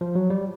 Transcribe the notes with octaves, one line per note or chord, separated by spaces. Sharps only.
F3
F#3
G3